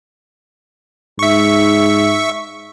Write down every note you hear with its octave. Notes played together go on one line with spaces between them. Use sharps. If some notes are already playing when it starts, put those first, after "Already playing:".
G#2 E5 C#6